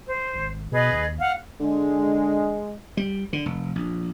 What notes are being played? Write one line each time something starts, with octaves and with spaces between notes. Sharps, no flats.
C5
G#1
B2 G#4 B4 D#5
D#2
F5 F#5
D3 G#3
G3
D3
F1
A#1